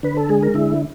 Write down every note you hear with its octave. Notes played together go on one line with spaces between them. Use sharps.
D3 B4
A4
G#3 G#4
A#4
D3 E4